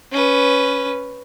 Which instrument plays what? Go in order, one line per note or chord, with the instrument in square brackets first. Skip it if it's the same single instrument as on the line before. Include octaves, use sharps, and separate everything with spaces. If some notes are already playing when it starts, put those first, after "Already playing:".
[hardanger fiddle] C#4 B4